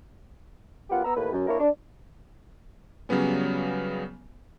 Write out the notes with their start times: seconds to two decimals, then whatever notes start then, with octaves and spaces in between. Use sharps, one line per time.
0.90 F#2 B3 F4 G4 F#5
1.05 B3 A#5 E6
1.16 D#2 A2 A#3 B4
1.33 F#2
1.48 A#3 D4 E4 A#4 C#5 D5
1.59 D4
3.09 C#3 F#3 G3 B3 C#4